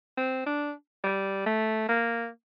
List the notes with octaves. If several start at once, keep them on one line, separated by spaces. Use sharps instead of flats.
C4
D4
G3
A3
A#3